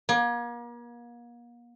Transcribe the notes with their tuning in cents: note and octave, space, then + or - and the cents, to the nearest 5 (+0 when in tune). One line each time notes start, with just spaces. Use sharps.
A#3 +40